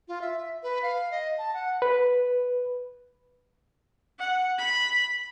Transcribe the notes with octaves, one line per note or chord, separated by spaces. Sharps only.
F4
E5
B4
F5
D#5
A5
F#5
B4
F#5
B5